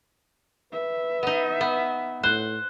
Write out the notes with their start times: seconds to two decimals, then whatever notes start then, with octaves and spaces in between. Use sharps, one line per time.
0.73 B4 E5
1.23 B3 D#4
1.61 B3
2.23 A2 C5 F#6